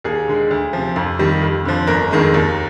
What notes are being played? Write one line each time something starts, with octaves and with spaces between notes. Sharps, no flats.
D#2 G#4
D3 G#3
D2
C3 F3
F2
D#3 G3
F2
D3 F3
G1 A#4
F2 D#3 G#3
D#2